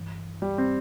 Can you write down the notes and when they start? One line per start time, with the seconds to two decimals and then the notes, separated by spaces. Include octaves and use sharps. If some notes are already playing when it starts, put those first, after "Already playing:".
Already playing: G2 E3
0.42 G3
0.58 C4